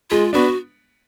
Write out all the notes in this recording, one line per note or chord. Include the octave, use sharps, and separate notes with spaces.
G#3 F4
B3 D4 F#4